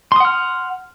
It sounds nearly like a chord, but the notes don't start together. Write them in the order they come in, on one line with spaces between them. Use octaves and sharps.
C6 D#6 F#5 F6